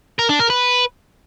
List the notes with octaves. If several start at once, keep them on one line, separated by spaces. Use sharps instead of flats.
A#4
D4
A#4
B4